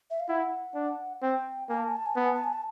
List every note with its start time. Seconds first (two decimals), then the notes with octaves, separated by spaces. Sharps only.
0.11 E5
0.20 F5
0.28 E4 F#5
0.75 D4
1.22 C4 G5
1.69 A#3 G#5
1.78 A5
1.88 G#5
1.97 A5
2.06 G#5
2.15 B3 A5
2.25 G#5
2.35 A5
2.44 G#5
2.53 A5